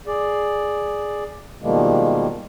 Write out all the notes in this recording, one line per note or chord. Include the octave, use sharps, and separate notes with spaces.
G#4 D5
B2 D#3 F3 G3 G#3 A#3